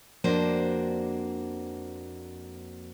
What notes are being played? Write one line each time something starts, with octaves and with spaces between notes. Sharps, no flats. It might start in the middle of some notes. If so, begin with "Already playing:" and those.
F2 A#3 D4 F#4 C5